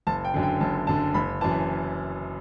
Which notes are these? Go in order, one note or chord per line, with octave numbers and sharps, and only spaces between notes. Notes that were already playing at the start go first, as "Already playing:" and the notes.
F#1 A5
G5
F#2 D3
G5
F#1 A5
F#2 D3 A5
F#1 B5
F#2 E3 A5